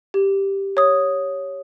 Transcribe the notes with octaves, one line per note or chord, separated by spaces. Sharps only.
G4
C#5 D#6